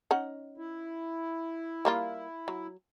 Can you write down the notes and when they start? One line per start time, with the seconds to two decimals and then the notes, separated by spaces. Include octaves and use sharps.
0.11 C#4 D#4 F#5
0.58 E4
1.85 G3 A#3 F4
2.48 F#3